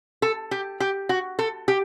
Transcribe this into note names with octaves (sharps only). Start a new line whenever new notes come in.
A4
G4
G4
F#4
A4
G4